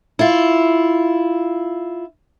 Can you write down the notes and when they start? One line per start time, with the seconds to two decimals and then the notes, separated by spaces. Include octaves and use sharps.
0.19 E4 F4